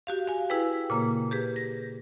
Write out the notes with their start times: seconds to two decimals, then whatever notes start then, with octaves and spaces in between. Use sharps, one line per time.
0.07 F#4 G4 F5
0.28 F5 G#5
0.49 E4 G#4 B4 G5
0.90 A#2 C#3 A#3
1.31 G4 G#4 B4
1.56 A#6